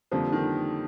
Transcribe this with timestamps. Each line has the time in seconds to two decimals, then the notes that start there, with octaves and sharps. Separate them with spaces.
0.11 F2 D3 F3 G3 A#3 D4 F4
0.32 D#3